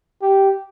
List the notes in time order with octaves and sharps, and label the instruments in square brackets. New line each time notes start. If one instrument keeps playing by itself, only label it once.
[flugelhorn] G4